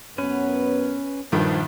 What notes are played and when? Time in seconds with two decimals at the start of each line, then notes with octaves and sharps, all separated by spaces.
0.18 F#2 B3 C#4 B4
1.32 A#1 G2 D#3 F3 A#3 E4